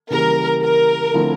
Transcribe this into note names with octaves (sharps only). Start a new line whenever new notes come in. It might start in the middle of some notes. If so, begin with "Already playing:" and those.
C#3 E3 G3 A#3 A#4
A#4
D3 F3 A3 C4 E4